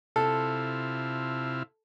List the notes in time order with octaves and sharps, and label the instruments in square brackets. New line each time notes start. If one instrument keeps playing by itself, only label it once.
[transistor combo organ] C3 E4 F4 [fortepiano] A4